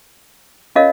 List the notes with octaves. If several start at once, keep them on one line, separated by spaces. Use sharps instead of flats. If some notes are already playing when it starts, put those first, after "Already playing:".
C#4 F4 A#4 C#5 D#5 F5